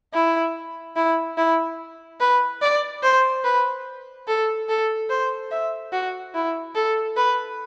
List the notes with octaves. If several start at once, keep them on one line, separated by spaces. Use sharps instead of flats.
E4
E4
E4
B4
D5
C5
B4
A4
A4
C5
E5
F#4
E4
A4
B4